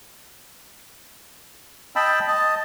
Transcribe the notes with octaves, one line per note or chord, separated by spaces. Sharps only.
D#5 G5 A5 B5 E6
D#5 A5